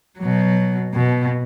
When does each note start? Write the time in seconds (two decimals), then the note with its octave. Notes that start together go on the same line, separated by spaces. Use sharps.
0.19 B2 F#3
0.94 B2